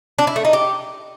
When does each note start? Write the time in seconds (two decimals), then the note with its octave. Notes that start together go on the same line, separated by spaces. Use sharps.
0.19 D4
0.27 E4
0.36 A3
0.45 D#4
0.53 G4